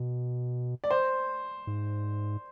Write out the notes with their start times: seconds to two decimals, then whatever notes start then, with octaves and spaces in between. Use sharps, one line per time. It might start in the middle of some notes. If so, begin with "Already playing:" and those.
Already playing: B2
0.84 D5
0.91 C5
1.67 G#2